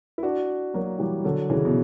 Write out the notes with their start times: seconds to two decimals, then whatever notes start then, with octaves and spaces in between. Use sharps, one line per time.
0.18 E4
0.23 D4 F#4
0.74 F#3 A#3
0.99 E3 G3
1.24 D3 F#3
1.50 C#3 E3
1.65 B2